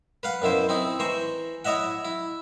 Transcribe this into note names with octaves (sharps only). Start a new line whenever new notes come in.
B4 F5 F#5
F#2 B2 E4 C5
C4 D#4 E4
E3 C5 A#5 C#6
E4 C#5 D#5 E5 F#5
E4